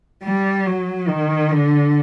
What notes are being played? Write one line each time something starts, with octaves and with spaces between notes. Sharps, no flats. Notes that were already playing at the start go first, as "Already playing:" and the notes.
G3
F#3
D#3
D3